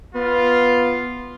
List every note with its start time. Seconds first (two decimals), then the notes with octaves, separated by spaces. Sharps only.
0.15 B3 F4